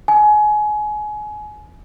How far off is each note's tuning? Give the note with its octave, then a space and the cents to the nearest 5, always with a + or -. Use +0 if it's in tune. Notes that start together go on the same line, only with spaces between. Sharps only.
G#5 +25